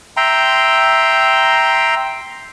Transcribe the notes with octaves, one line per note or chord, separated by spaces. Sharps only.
E5 G5 A#5 C6